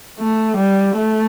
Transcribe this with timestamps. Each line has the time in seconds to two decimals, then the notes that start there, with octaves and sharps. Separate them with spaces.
0.19 A3
0.57 G3
0.97 A3